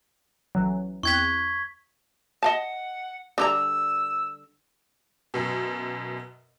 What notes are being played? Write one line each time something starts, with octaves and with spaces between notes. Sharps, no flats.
A1 E3 F#3
E2 C4 C#6 F#6 G#6 B6
D#5 F5 F#5 A5
D3 G3 A#5 E6
F#2 B2